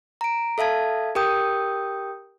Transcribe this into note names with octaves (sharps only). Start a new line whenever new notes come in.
A#5 D7
A4 E5 F5 A5 G#6
G4 A#4 G5 D#6 G6